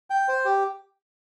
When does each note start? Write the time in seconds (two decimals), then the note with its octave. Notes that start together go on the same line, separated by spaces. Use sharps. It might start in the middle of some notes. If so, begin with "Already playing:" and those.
0.10 G5
0.28 C5
0.45 G4